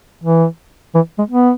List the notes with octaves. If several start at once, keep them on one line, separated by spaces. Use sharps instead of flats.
E3
E3
G#3
B3